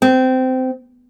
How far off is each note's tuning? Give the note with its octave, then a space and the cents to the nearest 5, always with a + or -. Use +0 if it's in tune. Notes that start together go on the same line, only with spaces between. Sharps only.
C4 -20